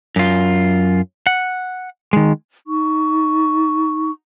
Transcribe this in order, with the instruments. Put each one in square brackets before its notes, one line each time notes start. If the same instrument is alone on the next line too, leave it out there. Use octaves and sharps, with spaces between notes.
[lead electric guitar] F#2 F4
[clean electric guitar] F#5
D#3 G#3
[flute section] D#4 C#6